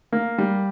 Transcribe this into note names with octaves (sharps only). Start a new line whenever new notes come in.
A#3
G3